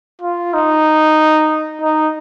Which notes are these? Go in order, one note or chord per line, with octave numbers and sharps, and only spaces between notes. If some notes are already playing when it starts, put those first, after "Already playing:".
F4
D#4
D#4